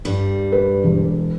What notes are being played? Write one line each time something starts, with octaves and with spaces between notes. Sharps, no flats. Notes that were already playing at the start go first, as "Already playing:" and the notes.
G2 G3
B4
E1